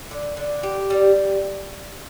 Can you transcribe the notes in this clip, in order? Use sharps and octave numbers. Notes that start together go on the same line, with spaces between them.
D3
D3
G4
G3